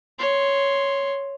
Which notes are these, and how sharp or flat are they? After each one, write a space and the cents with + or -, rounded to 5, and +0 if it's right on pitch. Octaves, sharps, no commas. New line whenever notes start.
C#5 +0 C6 +0